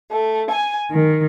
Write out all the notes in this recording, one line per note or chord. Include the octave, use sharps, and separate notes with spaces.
A3
G#5
D#3